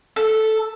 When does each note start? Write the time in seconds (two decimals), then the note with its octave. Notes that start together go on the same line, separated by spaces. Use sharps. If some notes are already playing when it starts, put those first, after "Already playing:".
0.16 A4